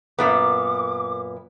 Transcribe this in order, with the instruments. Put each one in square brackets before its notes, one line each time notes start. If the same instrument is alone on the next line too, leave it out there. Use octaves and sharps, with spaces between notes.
[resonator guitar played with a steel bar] F#2 A#2 B3 [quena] D6